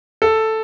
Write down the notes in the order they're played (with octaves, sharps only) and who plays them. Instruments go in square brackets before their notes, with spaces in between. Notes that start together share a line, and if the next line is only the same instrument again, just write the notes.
[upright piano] A4